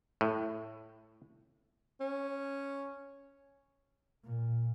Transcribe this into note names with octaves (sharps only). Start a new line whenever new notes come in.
A2
C#4
A#2